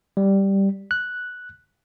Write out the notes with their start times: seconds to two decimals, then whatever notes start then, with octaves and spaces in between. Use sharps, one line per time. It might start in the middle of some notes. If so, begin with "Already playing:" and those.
0.17 G3
0.91 F#6